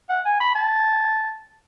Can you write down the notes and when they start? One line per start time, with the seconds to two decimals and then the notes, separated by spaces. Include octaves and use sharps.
0.09 F#5
0.25 G#5
0.40 B5
0.55 A5